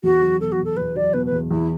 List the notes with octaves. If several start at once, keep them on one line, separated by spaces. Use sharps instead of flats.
E2 F#4
F#3
B2 A4
F#4
E2
A4
E2 B4
F#3 D5
B2 B4
B4
E2
E2 E4